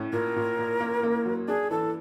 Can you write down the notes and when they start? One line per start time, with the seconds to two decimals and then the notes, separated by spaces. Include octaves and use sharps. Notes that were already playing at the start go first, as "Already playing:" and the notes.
Already playing: A2 C#4
0.13 A#2 A#4
0.36 A#2
0.59 A#2
0.81 A#3
1.03 A#3
1.25 F#3
1.48 D4 G#4
1.71 E3 A4